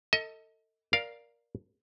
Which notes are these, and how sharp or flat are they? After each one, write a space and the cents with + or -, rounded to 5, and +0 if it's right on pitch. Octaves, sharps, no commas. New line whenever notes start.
A4 +30 D#5 +30
A#4 +15 D5 +0 F5 +0